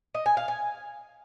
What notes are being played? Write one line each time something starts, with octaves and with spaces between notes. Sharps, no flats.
D#5
G#5
F5
G#5